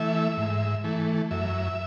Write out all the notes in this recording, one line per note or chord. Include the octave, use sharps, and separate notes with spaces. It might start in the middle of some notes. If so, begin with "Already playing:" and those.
Already playing: E3 A3 E5
G#2
E3 A3
F#2 E5